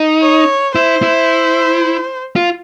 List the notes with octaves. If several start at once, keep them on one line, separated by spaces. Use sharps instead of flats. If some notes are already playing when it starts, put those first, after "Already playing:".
Already playing: D#4
C#5
E4 C5
E4
F4